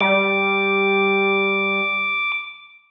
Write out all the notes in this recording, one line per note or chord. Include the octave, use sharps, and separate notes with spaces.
G3 D6